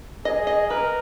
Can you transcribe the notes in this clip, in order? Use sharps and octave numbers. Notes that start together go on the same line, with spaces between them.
G#4 D#5
D#5
A#4 B4